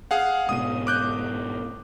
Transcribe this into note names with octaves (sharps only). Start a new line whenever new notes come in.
G#4 F5 F#5
G#2 B2 D#6 D#7
D6 F#6 G6